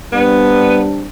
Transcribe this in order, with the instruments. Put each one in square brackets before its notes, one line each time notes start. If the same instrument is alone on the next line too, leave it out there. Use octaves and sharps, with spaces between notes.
[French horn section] G3 C4 D4 [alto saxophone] B3